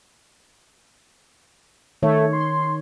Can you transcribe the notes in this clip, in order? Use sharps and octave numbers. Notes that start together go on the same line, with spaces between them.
D#3 A3 C#5
C6